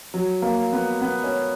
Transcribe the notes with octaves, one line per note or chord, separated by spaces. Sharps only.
F#3
A#3
B3
B3
C#4